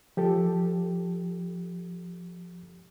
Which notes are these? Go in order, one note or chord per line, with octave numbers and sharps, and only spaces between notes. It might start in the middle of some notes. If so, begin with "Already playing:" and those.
F3 G4 A4